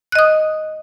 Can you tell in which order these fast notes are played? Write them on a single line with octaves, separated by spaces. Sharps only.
F#6 D#5 D#6